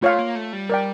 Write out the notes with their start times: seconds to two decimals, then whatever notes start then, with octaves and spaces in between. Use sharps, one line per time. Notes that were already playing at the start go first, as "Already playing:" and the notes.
0.02 A3 F4 C#5 F5
0.19 A#3
0.35 A3
0.53 G3
0.70 A#4 D5 G5